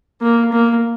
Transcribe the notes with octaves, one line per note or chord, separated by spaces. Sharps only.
A#3
A#3